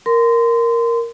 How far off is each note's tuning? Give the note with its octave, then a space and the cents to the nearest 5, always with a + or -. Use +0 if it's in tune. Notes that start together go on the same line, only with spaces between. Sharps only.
A#4 +0 C6 -25